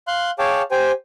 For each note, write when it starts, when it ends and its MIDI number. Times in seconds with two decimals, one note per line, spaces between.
0.08 0.31 77
0.08 0.31 84
0.08 0.31 90
0.39 0.62 68
0.39 0.62 73
0.39 0.62 77
0.39 0.62 79
0.39 0.62 81
0.39 0.62 86
0.71 0.92 67
0.71 0.92 72
0.71 0.92 79
0.71 0.92 80